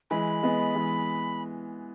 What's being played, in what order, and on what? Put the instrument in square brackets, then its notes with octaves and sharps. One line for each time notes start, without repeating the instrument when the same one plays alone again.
[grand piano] E3 G#3 [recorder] B5
[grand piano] G#3 B3
E3 G#3